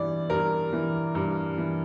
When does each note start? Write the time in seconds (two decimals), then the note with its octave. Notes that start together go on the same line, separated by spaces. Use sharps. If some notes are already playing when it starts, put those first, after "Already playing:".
Already playing: G2 E3 D5
0.30 G2 A#4
0.73 E3
1.15 G2
1.58 E3